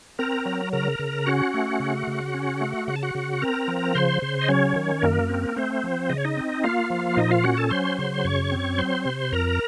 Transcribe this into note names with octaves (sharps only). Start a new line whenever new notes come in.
C4 A#4 A#5
F#3
C#3 A#4 A#5
C#3
C#4 F#4 F#5
A3
C#3
C#3
C#4
A3
C#3 F#5
A5
F#4 F#5
C#3
C4 A#4 A#5
F3
C#3 C5 C6
C#3
D#5
F#3 C#4 C#5
D#3
F#2 A#3 A#4
C4
A3 C4 C5
F3
C#3 D#5
C#5
D#4 D#5
C4
A#3 F4 F5
F3
A#2 D#4 D#5
F4 F5
C#4 F#4 F#5
A4 A5
F#3 C5 C6
C#3
F#2 C#5 C#6
C4
F#3 C5 C6
C3
F2 A#4 A#5